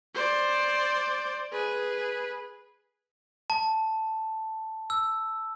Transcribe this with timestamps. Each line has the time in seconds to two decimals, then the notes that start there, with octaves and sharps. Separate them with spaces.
0.15 C5 D5
1.53 G#4 B4
3.50 A5
4.90 E6